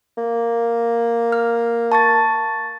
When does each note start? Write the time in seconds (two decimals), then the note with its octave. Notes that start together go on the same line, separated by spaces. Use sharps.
0.18 A#3
1.32 F6
1.92 A5 C#6 A6